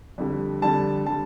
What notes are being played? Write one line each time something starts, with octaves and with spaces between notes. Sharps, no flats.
F2 D3 G3
F2 D3 G3 A5
D3 G3 A5